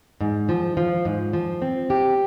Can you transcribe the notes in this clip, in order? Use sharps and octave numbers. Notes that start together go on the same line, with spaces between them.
G#2
F3
F3
G#2
F3
C4
G4